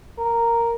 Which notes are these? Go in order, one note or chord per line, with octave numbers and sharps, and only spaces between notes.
A#4